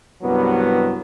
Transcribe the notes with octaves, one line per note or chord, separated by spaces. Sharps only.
C2 G2 F#3 B3